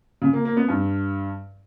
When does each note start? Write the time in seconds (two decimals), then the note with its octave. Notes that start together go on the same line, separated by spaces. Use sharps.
0.22 C#3
0.33 A#3
0.45 A#3
0.57 B3
0.69 G2